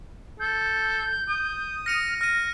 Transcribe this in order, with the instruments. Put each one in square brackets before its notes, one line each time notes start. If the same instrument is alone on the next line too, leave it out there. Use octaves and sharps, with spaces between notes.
[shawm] A4 [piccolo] G6
[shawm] D#6
[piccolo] F6 [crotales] A#6 C#7 D#7
[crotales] F6 D#7 [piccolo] A#6